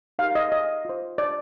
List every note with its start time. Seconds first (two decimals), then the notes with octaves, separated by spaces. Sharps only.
0.19 D#4 G4 A#4 F5
0.35 D#5
0.52 D#5
0.85 F4 C5
1.18 D5